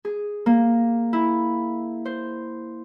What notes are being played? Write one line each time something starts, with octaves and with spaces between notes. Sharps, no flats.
G#4
A#3
E4
C5